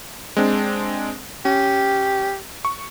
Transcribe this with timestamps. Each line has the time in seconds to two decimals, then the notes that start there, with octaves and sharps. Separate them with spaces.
0.37 G#3 C4 D4
1.45 C#4 G4
2.65 C#6